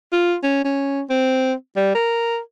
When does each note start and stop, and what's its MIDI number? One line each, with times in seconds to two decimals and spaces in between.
0.13 0.35 65
0.43 0.64 61
0.64 1.02 61
1.10 1.53 60
1.76 1.94 55
1.95 2.39 70